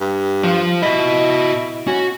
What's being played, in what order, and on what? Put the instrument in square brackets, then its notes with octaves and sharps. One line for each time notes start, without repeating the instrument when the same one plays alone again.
[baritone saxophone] G2
[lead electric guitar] F3 F4
[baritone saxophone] E4 [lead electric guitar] F#4 D#5
[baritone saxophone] C#4 [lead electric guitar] F#4